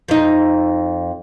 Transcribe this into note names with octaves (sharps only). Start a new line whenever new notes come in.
F2 D#4